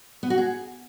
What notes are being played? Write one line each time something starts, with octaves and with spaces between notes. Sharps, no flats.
B3
F#4
G#4